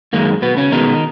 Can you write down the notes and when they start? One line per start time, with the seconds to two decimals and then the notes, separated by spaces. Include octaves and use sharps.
0.13 F#2 D#3 G#3 A#3
0.42 B2 B3
0.57 C#3 C#4
0.72 B2 D#3 G#3 D#4